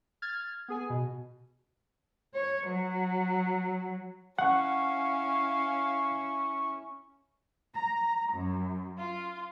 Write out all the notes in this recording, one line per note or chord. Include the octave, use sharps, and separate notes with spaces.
F6 G#6 A6
B3 G#4 G#5
B2
C#5
F#3
C#4 E4 F5 F#5 C#6
A#5
F#2
F4